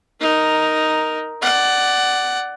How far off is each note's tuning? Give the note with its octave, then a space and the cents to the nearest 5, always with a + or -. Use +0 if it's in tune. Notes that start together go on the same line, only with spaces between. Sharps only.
D#4 +0 A#4 +0
D5 +0 F#5 +15